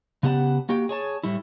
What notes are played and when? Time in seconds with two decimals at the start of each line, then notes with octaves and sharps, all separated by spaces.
0.23 C#3 B3 G4 F#5 A5
0.69 A#3 F#4 G4 G5
0.89 G#4 C#5 A5
1.23 A2 G3 A3 E4